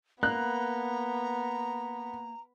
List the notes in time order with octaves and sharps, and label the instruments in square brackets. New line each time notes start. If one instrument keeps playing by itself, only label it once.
[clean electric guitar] A#3 [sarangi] B3 [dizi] A#5 [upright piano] F#6